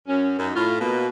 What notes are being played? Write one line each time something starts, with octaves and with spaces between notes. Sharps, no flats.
F#2 C#4
F#2 D#4
A2 F4
B2 A#3